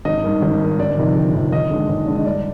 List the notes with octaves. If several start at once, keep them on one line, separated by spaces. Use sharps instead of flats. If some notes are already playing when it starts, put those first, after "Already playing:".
G#1 D#5
G2 D#3
G#1
G2 D#3
G1 D5
F2 C3 D#3
G1
F2 C3 D#3
D#2 D#5
D3 G#3 D4
D#2
D3 G#3 D4
D#5
G2 D5